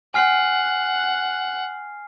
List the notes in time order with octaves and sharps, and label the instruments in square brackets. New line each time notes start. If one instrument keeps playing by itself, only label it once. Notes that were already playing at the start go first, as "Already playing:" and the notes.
[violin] F#5 [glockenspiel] G#5 F6 C7